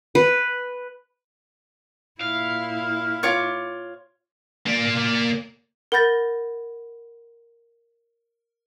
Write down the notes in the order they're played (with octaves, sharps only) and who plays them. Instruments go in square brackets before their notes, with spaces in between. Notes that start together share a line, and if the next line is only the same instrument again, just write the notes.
[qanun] B4
[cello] A#2 E4 [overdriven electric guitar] F5
[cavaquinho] F4 C#5 D6
[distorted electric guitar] A#3 D5
[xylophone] A#4 F#5 B5 G6 A6 A#6